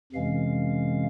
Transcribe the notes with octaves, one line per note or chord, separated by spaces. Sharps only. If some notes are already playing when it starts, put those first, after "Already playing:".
F2 C3 E3 G#3 C#4 F5